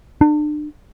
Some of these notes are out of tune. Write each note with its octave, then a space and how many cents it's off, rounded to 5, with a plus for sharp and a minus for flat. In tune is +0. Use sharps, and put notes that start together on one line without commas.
D4 +35